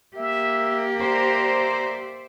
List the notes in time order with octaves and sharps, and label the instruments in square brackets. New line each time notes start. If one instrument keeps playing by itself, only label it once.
[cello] A#3 G4 [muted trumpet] E5
[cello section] C5 D5 E5 [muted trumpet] A#5